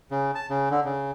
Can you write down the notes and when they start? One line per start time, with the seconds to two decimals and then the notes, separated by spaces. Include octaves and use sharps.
0.11 C#3
0.35 A5
0.50 C#3
0.71 D3
0.85 C#3